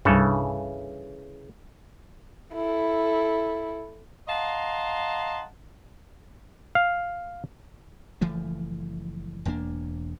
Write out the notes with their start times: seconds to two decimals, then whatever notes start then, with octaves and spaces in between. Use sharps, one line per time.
0.05 C2 G2 C#3 E3 A4
2.54 E4 A4
4.28 D#5 F5 F#5 A5 A#5 C6
6.75 F5
8.21 F#1 E3 F3 A3
9.45 E1 E2 A#3 D4